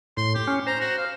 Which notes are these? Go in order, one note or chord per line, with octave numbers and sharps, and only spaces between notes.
A2 C6
G4
C#4
C5 A#5
F#4
F5